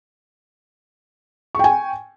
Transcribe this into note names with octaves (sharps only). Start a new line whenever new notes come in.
G5 G#5 C#6